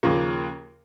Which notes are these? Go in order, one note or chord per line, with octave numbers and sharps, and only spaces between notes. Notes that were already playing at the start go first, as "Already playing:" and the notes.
D#2 C#3 F3 A#3